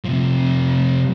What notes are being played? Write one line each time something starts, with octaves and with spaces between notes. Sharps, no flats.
C3 F3